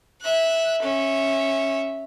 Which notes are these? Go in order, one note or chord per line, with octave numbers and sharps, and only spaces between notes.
E5 F#6
C#4 E5